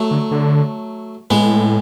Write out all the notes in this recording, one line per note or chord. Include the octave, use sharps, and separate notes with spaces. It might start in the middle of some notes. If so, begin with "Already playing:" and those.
Already playing: F#3 A3
D3
D3
A2 G#3 B3